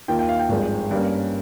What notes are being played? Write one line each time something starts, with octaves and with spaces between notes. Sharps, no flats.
D#2 D#3 A#3 F4 G5
G5
F5
G5
G#1 G2 F3 G#3
G2 G3 A#3 C#4